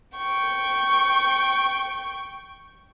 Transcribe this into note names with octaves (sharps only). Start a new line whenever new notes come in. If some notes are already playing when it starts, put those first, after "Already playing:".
G5 C#6